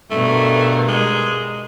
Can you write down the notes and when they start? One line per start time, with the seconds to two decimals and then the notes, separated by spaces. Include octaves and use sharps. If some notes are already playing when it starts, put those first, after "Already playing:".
0.10 G2 B2 A3 A#4
0.88 G#3